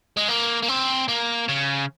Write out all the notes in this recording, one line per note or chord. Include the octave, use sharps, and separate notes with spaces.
G#3
A#3
A#3
C4
A#3
C#3